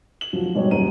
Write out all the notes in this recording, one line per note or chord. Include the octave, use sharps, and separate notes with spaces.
F#7
F1 F3 F#3
G#2 B2 G3 C#5
D#1 F#2 G3 A#5 D#7